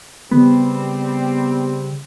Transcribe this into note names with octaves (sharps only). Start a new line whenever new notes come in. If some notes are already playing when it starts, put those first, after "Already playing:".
C#3 G3 B3 C4